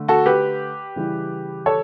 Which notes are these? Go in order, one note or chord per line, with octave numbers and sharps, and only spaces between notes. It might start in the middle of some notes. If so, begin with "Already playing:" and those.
Already playing: D3 A3
F#4 A4
G4 B4
C#3 E3 G3
A4 C#5